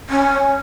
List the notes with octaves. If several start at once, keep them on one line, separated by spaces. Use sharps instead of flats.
C#4